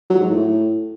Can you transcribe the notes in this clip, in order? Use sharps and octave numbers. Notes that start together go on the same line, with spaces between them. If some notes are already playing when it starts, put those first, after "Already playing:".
F#3
G#2
A2